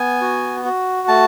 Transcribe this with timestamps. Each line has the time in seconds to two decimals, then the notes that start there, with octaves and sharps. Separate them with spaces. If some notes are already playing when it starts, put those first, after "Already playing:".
Already playing: B3 G#5
0.21 F#4
0.65 F#4
1.08 A3 A5